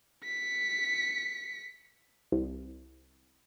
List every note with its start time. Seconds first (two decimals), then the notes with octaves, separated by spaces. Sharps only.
0.24 B6 C#7
2.32 C2